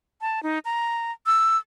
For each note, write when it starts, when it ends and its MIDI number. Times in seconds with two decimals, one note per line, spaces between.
0.21 0.42 81
0.43 0.59 63
0.65 1.12 82
1.26 1.57 88